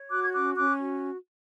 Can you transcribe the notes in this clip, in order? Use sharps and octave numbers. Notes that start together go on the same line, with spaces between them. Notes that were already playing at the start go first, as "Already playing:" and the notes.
Already playing: C#5
F#4 D6 F#6
G#6
C#4 D6 F#6
C#4 D6 F#6
F#4